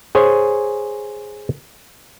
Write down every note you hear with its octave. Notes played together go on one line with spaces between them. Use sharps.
G#4 C5 C#5 G#5